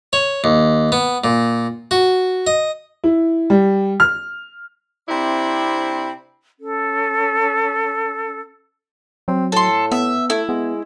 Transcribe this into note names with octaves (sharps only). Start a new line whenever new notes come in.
C#5
D#2
B3
A#2
F#4
D#5
E4
G3
F6
C3 C4 D4 E4 B5
C#4 A4
F#3 C4
A2 A4 C6
B3 E5
A3 E4
G#3 B3